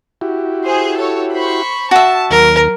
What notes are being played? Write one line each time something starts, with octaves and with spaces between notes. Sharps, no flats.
E4 F#4 G4
G#4 C5
A4 C#5
C5 B5 C#6
F#4 E5 A5
D#2 F#3 A#4